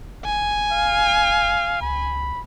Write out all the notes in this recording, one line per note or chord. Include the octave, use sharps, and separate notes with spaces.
F1 G#5
F5
C#2 B5